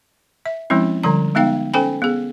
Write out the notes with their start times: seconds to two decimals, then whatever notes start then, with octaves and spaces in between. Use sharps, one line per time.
0.46 E5
0.70 F3 G#3 C4 C#4 E4
1.03 D3 F3 G3 A#5
1.35 G#3 B3 D#4 F5 G5
1.74 C#4 A4 C5 G5 G#5 B5
2.02 B3 G#4